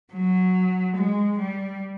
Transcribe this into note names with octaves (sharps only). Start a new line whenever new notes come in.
F#3
G#3
G3